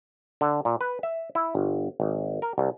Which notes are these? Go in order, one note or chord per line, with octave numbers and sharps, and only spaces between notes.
D3
A#2
B4
E5
E4
G1
G#1
A#4
C2